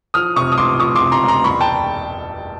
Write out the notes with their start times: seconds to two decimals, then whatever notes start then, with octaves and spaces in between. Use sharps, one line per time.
0.14 F3 D#6 F6
0.36 C3 C#6 D#6
0.52 D#6
0.58 C#2 C6 D6
0.79 F3 C#6 D#6
0.95 C6 D6
1.01 C3
1.12 A#5 C6
1.23 C#2
1.28 A#5 C6
1.44 E1 B5 C#6
1.60 G5 A5